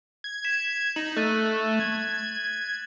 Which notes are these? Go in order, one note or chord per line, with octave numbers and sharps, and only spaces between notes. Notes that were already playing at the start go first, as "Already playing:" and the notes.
G#6
B6 E7
D#4 F#7
A3 F#6 A6 D#7
G#6